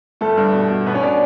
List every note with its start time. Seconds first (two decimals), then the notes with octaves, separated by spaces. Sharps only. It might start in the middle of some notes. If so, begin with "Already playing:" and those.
0.21 G1 A3 A4
0.37 G2
0.54 B2
0.70 B2
0.86 B2 B3 B4
0.94 C#4 C#5
1.03 B2 D4 D5